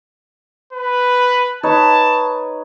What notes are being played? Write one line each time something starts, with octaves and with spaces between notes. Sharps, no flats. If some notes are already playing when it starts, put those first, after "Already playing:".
B4
D#4 B4 C#5 A5